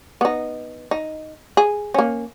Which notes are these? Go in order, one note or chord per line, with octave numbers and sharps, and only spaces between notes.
B3 D#4
D#4
G#4
A#3 C#4